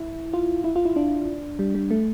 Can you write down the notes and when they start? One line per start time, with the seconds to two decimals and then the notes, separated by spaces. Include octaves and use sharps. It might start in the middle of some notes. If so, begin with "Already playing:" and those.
Already playing: E4
0.33 F4
0.64 E4
0.76 F4
0.85 E4
0.96 D4
1.59 G3
1.75 G3
1.91 A3